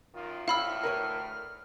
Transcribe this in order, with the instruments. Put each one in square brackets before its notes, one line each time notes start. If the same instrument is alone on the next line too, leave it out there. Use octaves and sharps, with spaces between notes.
[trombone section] F#2 D#3 F4
[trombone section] D2 A2 [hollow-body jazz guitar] E4 [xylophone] F5 B5 E6 [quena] F6
[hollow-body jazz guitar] A#4 B4 C#5